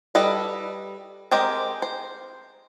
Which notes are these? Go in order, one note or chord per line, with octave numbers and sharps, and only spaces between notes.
G3 A4 B4 D#5
G#3 C4 G4 A#4 D#5
C5